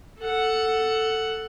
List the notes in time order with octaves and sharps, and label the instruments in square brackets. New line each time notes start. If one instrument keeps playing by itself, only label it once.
[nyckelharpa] A4 F#5